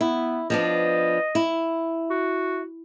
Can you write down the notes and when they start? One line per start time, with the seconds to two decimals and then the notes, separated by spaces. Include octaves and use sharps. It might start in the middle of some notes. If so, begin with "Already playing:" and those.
0.01 B3 E4
0.50 F3 B3 D4 D#5
1.35 E4
2.10 F#4